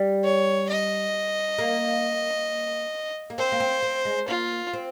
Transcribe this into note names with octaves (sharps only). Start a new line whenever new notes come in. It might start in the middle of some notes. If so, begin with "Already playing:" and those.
Already playing: G3
C#5
D#5
A#3
A#3
C4 C5
A#3
C4
C4
G#3
A#3 F4
C4